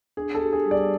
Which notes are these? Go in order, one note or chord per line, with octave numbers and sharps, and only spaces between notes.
D4 G#4
A4
G4
G#4
G3
D5